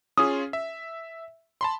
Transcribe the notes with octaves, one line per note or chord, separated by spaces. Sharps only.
C#4 F4 G#4 D#6
E5
A5 B5 C6